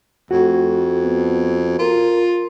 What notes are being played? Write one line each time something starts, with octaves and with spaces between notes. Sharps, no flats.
F2 A3 F#4
B3
F4 A#4